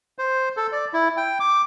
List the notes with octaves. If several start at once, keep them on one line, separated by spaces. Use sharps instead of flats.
C5
A4
D5
E4
G5
D6